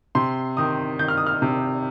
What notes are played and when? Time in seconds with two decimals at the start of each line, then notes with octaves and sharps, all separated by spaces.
0.15 C3 C6
0.57 D#3 D#6
0.99 D#3 G6
1.08 F6
1.18 D#6
1.27 F6
1.42 C3